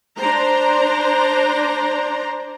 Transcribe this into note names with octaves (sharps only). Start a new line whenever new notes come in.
D4 C5 A#5